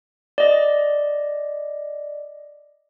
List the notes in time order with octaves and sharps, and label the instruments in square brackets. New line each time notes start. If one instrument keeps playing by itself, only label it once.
[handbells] D5 D#5